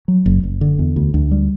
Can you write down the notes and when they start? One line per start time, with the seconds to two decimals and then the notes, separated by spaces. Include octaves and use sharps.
0.08 F#3
0.26 F#1
0.43 F#1
0.61 D3
0.79 E2
0.96 D2
1.14 D2
1.31 G3